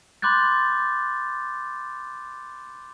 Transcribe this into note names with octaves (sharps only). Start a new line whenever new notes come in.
B5 C6 D6 F#6 G6 A6